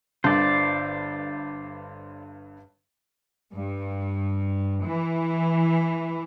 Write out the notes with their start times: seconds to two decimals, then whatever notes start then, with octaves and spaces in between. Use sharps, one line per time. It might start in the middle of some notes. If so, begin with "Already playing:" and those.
0.24 G1 G2 D3 C5 D5
3.52 G2
4.84 E3